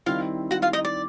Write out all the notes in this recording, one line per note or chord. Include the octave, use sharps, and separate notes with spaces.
D#3 G3 C4 E4 F4 F5
F#4 F#5
F4 F5
D#4 D#5
D5